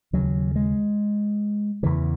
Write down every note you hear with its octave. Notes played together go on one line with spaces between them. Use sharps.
D#2 C#3 F#3
G#3
E2 C#3 E3